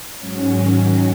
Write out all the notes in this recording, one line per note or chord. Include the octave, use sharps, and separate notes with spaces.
G#2 F#3 C#4
D#3 F#3 C#4